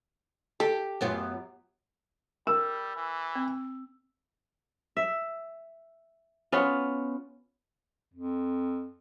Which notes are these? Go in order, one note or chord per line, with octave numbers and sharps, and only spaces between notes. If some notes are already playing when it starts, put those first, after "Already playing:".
G4 A4
F#2 B3 F4
G3 A#4 E6
E3
C4
E5
B3 C#4 F4
F2